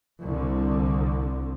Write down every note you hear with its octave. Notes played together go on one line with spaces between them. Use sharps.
C2 D3